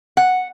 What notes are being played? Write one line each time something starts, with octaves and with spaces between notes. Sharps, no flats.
F#5